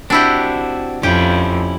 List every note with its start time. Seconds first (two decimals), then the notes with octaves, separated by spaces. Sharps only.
0.10 C4 D4 E4 F#4 G4
1.03 F2 C#4 E4 G4